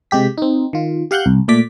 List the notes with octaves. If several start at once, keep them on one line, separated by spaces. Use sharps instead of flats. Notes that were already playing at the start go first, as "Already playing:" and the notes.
C3 G#3 G4 B6
C4 D#4
D#3 F4
G4 F5 F#5 F#6 G6
C2
A#2 A3 D5 D6 B6